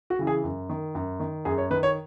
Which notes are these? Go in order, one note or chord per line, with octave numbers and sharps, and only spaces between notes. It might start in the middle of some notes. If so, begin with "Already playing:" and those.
F#4
C#3 E3
G#4
F#2
D#3
F#2
D#3
F#2 G#4
C#5
D#3 B4
C#5